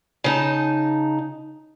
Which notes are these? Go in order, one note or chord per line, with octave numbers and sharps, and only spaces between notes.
C#3 D#4 A5